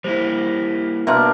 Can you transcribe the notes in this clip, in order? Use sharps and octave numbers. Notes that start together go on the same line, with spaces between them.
G3 A#3 E4 C5
B2 A#3 D4 E5 C6 F6